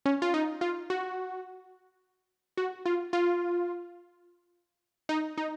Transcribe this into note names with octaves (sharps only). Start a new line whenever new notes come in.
C#4
F4
D#4
F4
F#4
F#4
F4
F4
D#4
D#4